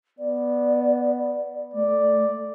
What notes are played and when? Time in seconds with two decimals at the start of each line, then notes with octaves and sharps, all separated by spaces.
0.19 B3 D5
1.74 A3 D5